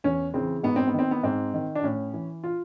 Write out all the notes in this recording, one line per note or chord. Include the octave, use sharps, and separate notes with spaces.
E2 C#4
C#3 E3 C4
G#2 B3
C4
B3
D#3 C4
B3
G#2 C4
D#3
D4
A2 C#4
E3
F4